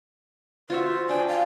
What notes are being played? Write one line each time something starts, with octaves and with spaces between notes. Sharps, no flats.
F4 F#4 C5 E5
D4 G5 G#5
F5